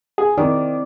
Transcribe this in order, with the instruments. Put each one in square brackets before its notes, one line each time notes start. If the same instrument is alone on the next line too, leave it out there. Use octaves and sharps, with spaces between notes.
[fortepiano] G#4
[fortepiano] D#3 [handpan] C4 E4 D5